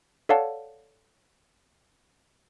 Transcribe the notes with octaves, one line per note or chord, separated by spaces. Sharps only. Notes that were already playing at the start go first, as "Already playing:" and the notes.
A4 C#5 D5 F5 F#5 A5